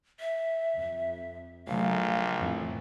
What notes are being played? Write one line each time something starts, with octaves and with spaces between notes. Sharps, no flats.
E5
F2
A#1 C#3 F#3 A3 F5
F2 A2 E3